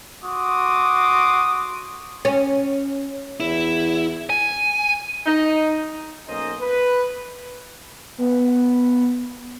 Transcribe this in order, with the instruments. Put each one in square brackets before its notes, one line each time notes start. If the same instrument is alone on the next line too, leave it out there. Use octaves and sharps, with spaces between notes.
[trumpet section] F#4 C6 D6 D#6
[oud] C#4
[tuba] E2 [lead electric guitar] E4
[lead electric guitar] G#5
[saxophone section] D#4
[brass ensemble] B1 A#3 C#4 C5 D#5
B4
[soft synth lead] B3